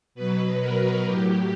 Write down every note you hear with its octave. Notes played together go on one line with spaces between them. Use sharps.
B2 F#3 B4
A#4
A2 F#3 G4